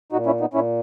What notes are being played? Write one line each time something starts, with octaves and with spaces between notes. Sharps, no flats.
A#2 D#4 F#4
C#4 E4
B3 D#4
A#2 C#4 E4